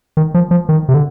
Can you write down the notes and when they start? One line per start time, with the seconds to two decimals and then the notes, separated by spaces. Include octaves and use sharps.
0.17 D#3
0.34 F3
0.51 F3
0.69 D#3
0.89 C3
0.94 D3